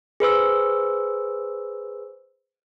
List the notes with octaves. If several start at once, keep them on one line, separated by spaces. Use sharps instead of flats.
G#4 B4 C5 E6